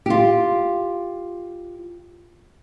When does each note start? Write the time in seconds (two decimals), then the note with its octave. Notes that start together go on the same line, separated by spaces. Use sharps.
0.06 F4 G4